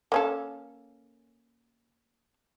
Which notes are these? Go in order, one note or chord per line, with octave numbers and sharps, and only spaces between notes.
A#3 C#4 A4